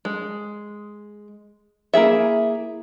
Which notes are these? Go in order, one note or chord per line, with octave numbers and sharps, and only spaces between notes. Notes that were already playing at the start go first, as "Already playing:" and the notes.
G#3
A#3 E4 G#4 E5